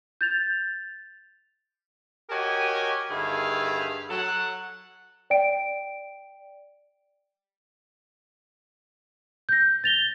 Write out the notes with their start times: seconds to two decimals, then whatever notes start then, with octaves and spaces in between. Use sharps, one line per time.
0.21 G6 A6 F7
2.30 F#4 G4 A#4 C#5 D#5 G#5
3.11 G2 D3 D#3 G#4 E5 F5
4.10 F#3 A4 F#5
5.30 D5 G5 D7
9.49 G6 A#6
9.84 A6 F7 G7